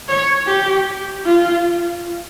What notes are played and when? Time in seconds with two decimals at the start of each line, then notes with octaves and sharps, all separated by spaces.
0.08 C#5
0.47 G4
1.26 F4